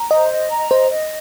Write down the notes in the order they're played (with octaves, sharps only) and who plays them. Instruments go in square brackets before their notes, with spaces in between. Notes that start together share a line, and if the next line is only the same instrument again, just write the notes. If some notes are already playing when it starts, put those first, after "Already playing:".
Already playing: [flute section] A#5
[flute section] C5 [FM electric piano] D#5
[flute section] D#5
A#5
[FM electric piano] C5 [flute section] D#5
[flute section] D#5